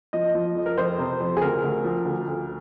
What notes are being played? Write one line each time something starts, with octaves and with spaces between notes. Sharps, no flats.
F3 D#5
F3
F2
A#4
F2 C5
C3
F2
G#4
D2 A#4
D2
F3
D2
D2